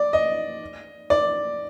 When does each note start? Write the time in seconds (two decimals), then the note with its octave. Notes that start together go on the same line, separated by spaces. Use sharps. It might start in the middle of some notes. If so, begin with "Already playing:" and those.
Already playing: D5
0.13 D#5
1.10 D5